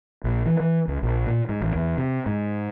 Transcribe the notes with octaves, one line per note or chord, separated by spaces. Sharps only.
A#1
E3
E3
C#2
A#1
A#2
G#2
A1
E2
C3
G#2